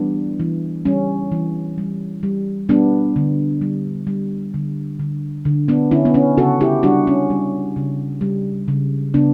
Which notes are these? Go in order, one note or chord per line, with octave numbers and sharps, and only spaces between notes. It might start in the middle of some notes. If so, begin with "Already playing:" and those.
Already playing: E3 G3 B3 D4
E3
G3 C#4
E3
G3
G3
G3 B3 D4
D3
G3
G3
D3
D3
D3
B3 D4
D3 C#4 E4
B3
C#4
C#3 F#4 A4
E4 G4
G3 D4 F#4
C#4
G3
C#3
G3
C#3
C#3 B3 D4